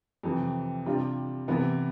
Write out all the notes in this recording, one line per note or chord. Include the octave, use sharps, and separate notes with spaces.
F2 C3 E3
C3 G3 D4 F4
C3 E3 B3